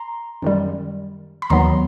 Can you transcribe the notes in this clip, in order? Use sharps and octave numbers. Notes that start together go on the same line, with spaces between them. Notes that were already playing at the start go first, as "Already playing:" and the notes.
Already playing: A#5 C6
F#2 D#3 G3
B5
D#2 D#3 F#3 B3 A#5 C6